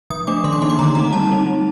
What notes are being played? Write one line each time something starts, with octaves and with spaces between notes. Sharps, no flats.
F3 D#6
A3 D4 D6
D#3 C6
D6
A#3 D#4 C6
D6
D3 A#5
A3 C4 D#4 A#5
G3 A5
C4 D#4
G3